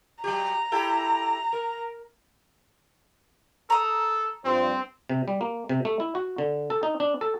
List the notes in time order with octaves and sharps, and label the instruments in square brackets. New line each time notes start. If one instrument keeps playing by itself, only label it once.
[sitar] F#3 G4 [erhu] A#5
[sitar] E4 G4 A4
A#4
[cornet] A4 [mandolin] A#5 D#6
[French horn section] G2 F3 C5 [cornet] C4
[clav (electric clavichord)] C3
G3
A#3
C3
A3
E4
F#4
D3
A4
D#4
D4
A4